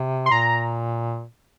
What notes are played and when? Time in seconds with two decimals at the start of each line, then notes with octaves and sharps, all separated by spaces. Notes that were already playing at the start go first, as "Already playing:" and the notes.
Already playing: C3
0.26 C6
0.31 A#2 A#5